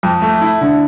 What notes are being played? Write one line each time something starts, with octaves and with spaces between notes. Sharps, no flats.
F2
A3
E4
D3